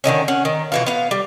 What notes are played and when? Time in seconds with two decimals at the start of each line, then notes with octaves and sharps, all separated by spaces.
0.04 D3 D#3 G#3 C#4
0.28 C#4 F#5
0.45 D#3
0.72 B2 E3 F4
0.86 B3 F5
1.11 G3